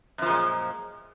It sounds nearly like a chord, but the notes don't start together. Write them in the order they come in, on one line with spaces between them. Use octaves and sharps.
F#2 F3 A#2 G#3